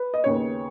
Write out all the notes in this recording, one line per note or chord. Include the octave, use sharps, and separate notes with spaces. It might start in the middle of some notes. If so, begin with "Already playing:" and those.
Already playing: B4
D#5
D#2 C#3 B3 C#5